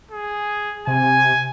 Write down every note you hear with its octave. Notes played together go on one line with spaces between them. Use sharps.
G#4
C3 G#5